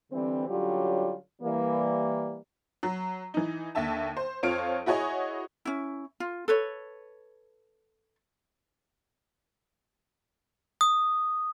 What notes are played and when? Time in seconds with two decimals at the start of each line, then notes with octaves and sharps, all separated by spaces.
0.12 D3 E3 G3 C4
0.47 D3 F#3 G3 C#4 F4 G4
1.42 E3 G3 A#3
2.83 F#3
3.34 E3 D#4
3.75 D#2 D3 E5 A5
4.17 C5
4.43 F2 C4 F4 C#5 F5 D7
4.86 E4 F#4 G#4 C#5 D#5
5.65 C#4 E4
6.20 F4
6.48 A4 B4 C#5
10.81 D#6